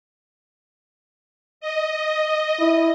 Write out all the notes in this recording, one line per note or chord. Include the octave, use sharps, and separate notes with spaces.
D#5
E4